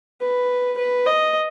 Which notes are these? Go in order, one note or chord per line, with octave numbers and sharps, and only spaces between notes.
B4
B4
D#5